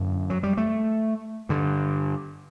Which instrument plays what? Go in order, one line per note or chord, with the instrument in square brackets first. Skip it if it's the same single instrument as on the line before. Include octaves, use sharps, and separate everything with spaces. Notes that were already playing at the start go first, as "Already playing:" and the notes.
Already playing: [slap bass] F#2 D3
F#3
G3
A3
G2 D3